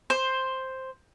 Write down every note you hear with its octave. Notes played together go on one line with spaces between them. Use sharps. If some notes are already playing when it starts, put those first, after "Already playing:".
C5